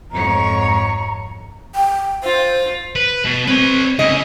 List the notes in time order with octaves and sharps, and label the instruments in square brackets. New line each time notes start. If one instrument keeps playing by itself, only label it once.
[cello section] F2 G#2 C#5 [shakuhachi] A#5
[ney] G5
[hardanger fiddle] F4 [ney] C5
[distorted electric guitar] B4
B2
[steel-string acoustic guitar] C4 [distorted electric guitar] B4 C#5
[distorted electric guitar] C#3 E4 [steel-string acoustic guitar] D#5